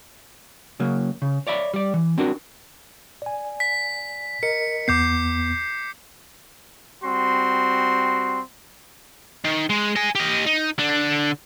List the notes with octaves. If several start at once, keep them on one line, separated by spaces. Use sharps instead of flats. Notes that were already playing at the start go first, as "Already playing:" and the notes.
C#3 F#3 A#3
C#3
C#5 D5 E5 B5
G3 D5
E3
C4 D4 F#4 A#4
D5 G#5
B6
A#4 D#5 C#7
E2 B3 D6 G6 C7
G3 C4 F#4 C6
D#3
G#3
D#5 G#5
G4 D#5
D#4
D3 D4